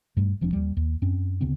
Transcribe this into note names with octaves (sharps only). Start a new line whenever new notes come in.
G2 G3 A3
E1 F3 C4 D4
D#2 G3
D#2
F#2 C4 C#4
D2 C#3 B3 C4